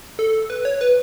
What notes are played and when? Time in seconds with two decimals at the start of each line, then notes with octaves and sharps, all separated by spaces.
0.19 A4
0.50 B4
0.65 C#5
0.81 B4